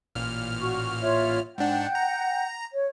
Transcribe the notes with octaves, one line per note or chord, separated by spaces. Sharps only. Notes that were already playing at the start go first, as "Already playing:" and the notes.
A1 A#2 F6
F#4 C#6
F4 C#5 E5
G#2 D4 F#5 G5 G6
A#5
C#5